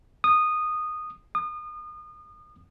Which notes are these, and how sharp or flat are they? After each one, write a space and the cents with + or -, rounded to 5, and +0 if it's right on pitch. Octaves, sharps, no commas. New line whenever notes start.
D#6 -15
D#6 -35